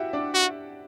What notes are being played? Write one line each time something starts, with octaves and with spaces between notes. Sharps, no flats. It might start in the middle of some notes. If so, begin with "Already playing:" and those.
Already playing: E4 F#4 G4 E5 F#5 G5
D4 D5
F#4